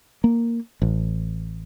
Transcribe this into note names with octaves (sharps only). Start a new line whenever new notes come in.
A#3
A1